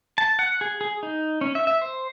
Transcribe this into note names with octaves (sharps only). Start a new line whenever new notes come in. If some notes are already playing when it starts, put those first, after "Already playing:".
A5
F#5
G#4
G#4
D#4
C#4
E5
E5
C5